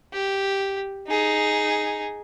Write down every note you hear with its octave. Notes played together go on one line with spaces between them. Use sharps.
G4
D#4 G#4